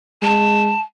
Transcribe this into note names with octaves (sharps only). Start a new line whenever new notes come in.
G#3 A5